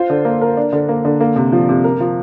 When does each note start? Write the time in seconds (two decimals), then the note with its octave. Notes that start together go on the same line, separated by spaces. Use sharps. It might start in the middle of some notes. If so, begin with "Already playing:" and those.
Already playing: F4 C5
0.10 D3
0.25 A#3
0.41 A#4
0.57 D4
0.73 D3
0.89 A#3
1.05 D3
1.20 A#3
1.36 C3
1.53 F3
1.69 C3
1.84 A#4
2.00 F3